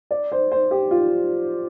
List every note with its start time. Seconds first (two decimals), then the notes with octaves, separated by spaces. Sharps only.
0.11 D5
0.32 C5
0.52 C5
0.71 G4
0.91 F4